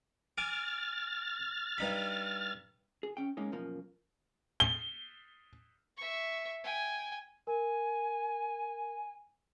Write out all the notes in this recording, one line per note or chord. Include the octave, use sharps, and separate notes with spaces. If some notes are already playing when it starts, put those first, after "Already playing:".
G#5 D6 F6 A6
G2 D#4 B5
G#4
C#4 G5
G#3 A#3 C#4 D#4 A#4
F#2 B2 F3 A#3
G7
E5 C#6
G5 G#5
A#4 G#5